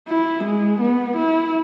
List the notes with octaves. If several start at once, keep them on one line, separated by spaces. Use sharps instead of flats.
E4
G#3
B3
E4